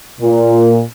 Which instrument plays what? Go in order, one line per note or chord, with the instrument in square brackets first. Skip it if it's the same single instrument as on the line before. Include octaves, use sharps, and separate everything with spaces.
[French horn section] A#2